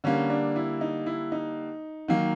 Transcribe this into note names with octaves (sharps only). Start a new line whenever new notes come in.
D3 G3 A#3 C#4
D4
E4
D#4
E4
D#4
D#3 F#3 A#3